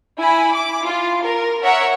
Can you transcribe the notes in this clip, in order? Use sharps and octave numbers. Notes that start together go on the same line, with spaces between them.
E4 G#5 B5
D6
F4
A#4
A#4 C#5 E5 F#5